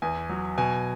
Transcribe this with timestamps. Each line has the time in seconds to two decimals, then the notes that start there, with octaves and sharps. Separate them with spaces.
0.02 E2 G#5
0.29 F#3
0.58 B2 G#5